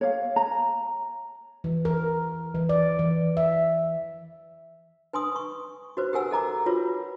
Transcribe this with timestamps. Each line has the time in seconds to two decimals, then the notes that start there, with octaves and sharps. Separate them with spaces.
0.01 C#5 F5
0.36 A#5
1.64 E3
1.85 A#4
2.55 E3
2.69 D5
2.99 E3
3.37 E5
5.13 B4 G#5 C6 D#6
5.36 C#6
5.97 F#4 B4 C5
6.13 G4 A#4 F#5 G#5 E6
6.31 A4 D#5 A#5 D6
6.66 F4 F#4 B4 C#5